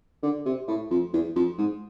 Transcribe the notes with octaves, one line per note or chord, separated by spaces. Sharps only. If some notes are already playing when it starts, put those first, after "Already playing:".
D3
C3
A2
F2
E2
F2
G#2